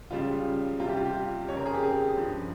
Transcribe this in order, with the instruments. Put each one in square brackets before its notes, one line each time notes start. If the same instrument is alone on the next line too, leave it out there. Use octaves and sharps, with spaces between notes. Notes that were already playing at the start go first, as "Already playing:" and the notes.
[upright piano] C#2 C#3 G3 F4
C2 C3 G3 F4
G4
F4
G4
F2 C#3 F3 C#5
A#4
G#4
G4
G#4
G2 F3